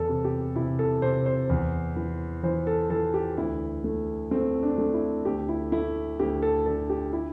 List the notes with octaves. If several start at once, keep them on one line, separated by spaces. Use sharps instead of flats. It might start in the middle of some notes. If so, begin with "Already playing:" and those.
Already playing: E2 A4
C3
G4
C3 E4
A4
C3 C5
C5
E2
E3
E3 C5
A4
E3 A4
G4
D2 E4
A3
A3 C4
D4
A3
E4
D2 G4
E4
A3 E4
D2 G4
A4
D3 A4
G4
E4